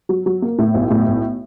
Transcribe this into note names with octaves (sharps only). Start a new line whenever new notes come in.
F#3
F#3
A#3
A2
B1
A2
B1